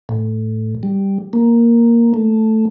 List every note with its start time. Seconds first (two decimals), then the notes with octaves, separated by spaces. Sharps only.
0.09 A2
0.83 G3
1.33 A#3
2.14 A3